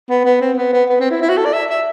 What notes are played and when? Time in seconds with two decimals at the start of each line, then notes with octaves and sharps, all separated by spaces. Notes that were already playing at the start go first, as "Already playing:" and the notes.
0.10 B3
0.25 B3
0.41 C4
0.57 B3
0.73 B3
0.89 B3
1.01 C4
1.11 E4
1.22 E4
1.29 F#4
1.37 A4
1.46 D5
1.53 E5
1.70 E5